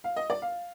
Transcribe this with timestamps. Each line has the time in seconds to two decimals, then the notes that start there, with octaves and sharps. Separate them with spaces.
0.04 F5
0.16 D#5
0.30 D5
0.42 F5